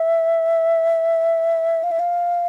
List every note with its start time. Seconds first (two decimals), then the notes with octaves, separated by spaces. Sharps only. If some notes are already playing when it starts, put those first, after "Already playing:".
Already playing: E5
1.83 F5
1.91 E5
1.99 F5